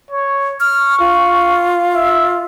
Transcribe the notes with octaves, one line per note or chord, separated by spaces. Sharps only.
C#5
C#6 F6
F4
E5